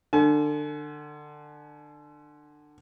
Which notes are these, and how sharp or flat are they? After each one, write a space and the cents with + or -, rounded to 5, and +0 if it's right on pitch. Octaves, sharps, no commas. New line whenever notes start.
D3 +25 G#5 +45